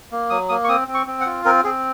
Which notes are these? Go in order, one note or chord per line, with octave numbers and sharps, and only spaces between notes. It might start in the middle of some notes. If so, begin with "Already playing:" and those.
A#3
F#3 D#6
A#3 D#6
C#6
C4 D#6
C4
C#6
C4
F#5
F4
C4 A#4
C4 G#4